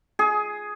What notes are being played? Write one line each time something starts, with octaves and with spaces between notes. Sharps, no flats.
G#4